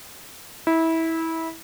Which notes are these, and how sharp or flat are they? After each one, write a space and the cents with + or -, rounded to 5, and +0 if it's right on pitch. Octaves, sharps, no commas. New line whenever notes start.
E4 -20